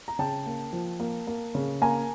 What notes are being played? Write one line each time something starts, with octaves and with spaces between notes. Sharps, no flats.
A#5
C#3 G5 A5
A#3
F3
A#3
A#3
C#3
A#3 G#5 A#5